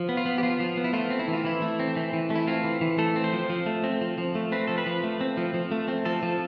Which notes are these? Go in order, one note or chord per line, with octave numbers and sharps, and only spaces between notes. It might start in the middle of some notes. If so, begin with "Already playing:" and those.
Already playing: F3
B3
F4
B3
G4
F3 F4
F3
B3
E4
A3 F4
C4
E4
E3
F4
E3 E4
A3
C4
E3
E3
A3
E4
C4 F4
E3
E3
A3 A4
C4
C5
F3
F3
A3
C4
F3
F3
A3
C4 B4
F3 A4
B4
F3
A3
C4
F3
F3
A3
C4
F3 A4
F3